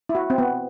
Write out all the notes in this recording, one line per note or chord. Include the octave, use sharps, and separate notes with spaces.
E4
F#4
C4
B3